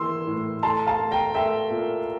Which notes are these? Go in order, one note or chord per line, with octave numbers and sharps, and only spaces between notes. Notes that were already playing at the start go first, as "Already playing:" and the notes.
Already playing: E3 A#3 C6 E6
A2
A3 A5 C6
F5 A5
A3
G5 A#5
A3 E5 G5
A#2